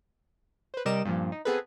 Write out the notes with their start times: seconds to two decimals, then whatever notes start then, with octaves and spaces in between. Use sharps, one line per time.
0.74 B4 C5
0.85 C3 G3 A#4 D#5 D6 E7
1.05 G2 A#2 F3
1.32 D#4
1.45 B3 C4 G#4 A4 B4